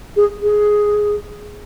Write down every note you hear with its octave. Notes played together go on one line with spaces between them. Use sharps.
G#4
G#4